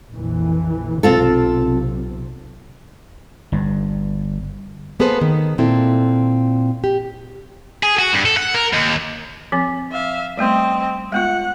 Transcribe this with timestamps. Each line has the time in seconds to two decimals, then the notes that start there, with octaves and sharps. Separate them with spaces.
0.15 A#1 F2 E3
1.03 B1 C3 C4 F4 A4
3.52 G1 G2
4.99 A#3 B3 G#4 A4 B4 C5
5.21 D#3
5.58 A#2 C4 E4 A4
6.84 G4
7.83 G#4
7.99 F#4
8.13 G2
8.25 A4
8.37 F#5
8.54 A#4
8.73 D#2
9.52 F3 C4
9.91 E5 F5
10.37 G3 A3 B3 C4 D#5
11.12 G#3 B3 F4 F#5